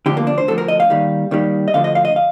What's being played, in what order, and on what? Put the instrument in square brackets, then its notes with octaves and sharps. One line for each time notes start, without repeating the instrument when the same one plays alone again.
[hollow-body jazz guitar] D2 D3 F3 G4
A#3
D4
C5
D2 D3 F3 A4
A#4
D#5
F5
D#2 D#3 G3
D#2 D#3 G3
D#5
D2 D3 F3 F5
D#5
F5
D#5
F5